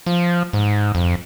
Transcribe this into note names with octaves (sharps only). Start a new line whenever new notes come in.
F3
G#2
F2